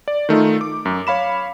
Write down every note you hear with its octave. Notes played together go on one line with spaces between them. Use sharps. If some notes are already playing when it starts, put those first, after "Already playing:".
D5
D#3 A3 D#4 F4
D6
F#2
C#5 F5 B5 E7